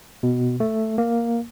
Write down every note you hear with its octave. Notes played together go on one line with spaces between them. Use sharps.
B2
A3
A#3